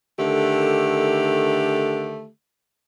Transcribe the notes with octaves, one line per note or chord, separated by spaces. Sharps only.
D3 D#3 A3 G4